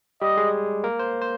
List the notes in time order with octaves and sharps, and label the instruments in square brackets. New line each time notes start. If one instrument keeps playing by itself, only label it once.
[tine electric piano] G3 G4 [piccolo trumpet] D#5
[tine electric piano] G#3 G#4
A#3 A#4
C5
C5